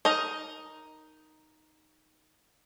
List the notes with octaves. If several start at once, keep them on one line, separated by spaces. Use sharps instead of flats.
D#4 A#4 D#5